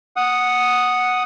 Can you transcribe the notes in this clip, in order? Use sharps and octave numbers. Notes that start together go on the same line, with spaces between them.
F#5 D#6